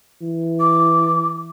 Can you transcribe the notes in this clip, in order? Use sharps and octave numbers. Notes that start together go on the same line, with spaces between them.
E3
D6